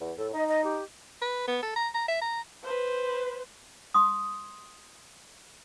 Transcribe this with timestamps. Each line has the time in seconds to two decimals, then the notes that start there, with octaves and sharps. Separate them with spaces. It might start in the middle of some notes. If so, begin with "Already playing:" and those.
0.01 E2
0.18 A2 A4
0.33 D#4 D#5
0.49 D#5
0.64 G4
1.21 B4
1.47 B3
1.62 A4
1.76 A#5
1.94 A#5
2.08 E5
2.21 A#5
2.63 B4 C5
3.94 C6 D#6